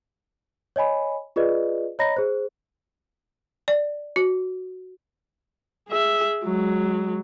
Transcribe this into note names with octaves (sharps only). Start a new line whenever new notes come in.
C#5 D#5 G#5 B5
F4 G#4 B4 D5 D#5
C#5 D#5 A#5 B5 A#6
G#4 C5
D5
F#4
G#4 E5
F#3 G#3